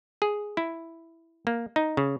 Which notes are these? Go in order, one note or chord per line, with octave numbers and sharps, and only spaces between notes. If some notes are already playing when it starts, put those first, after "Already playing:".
G#4
E4
A#3
D#4
C#3